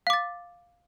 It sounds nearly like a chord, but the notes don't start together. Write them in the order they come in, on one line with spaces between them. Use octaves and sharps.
F5 D6 A6